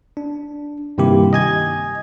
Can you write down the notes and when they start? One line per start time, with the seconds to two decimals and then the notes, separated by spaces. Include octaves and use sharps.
0.17 D4
0.98 G2 C3 D#3 A#3 E4 G4
1.33 D#5 G#5 G#6